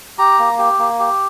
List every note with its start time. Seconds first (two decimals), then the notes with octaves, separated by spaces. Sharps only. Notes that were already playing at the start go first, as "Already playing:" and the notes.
0.18 G4 A#5
0.39 A#3
0.59 G4
0.79 A#3
0.99 G4